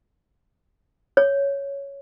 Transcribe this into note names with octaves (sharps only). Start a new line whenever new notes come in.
C#5